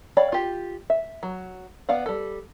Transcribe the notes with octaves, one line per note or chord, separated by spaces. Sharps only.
C#5 D5 F5 G5 B5
F4 G4
E5
F#3
B3 D5 F5 F#5
G3 A4